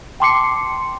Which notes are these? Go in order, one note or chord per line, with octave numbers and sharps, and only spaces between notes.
G5 A5 C6 D6 C7 C#7